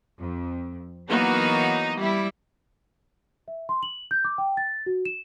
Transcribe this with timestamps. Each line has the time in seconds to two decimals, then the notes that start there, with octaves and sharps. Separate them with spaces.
0.18 F2
1.08 E3 F#3 A#3 B3 D#4 F#4
1.98 G3 E4
3.48 E5
3.69 C6
3.83 F#7
4.11 G6
4.25 D6
4.38 G5
4.57 A6
4.86 F#4
5.05 E7